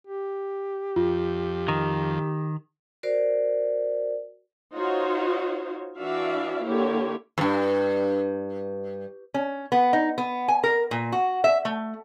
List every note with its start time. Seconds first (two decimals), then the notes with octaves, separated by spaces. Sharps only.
0.07 G4
0.96 F2 F4
1.68 D#3
3.03 F#4 A#4 C5 D5
4.75 D#4 F4 F#4 C5 C#5
5.98 E3 D4 F#4 D5 E5 F5
6.65 D3 A#3 E4 G4 C#5
7.38 E2 G2
9.34 C#4
9.72 B3
9.93 D#4
10.18 B3
10.48 G#5
10.64 A#4
10.91 A#2
11.12 F#4
11.44 E5
11.65 A3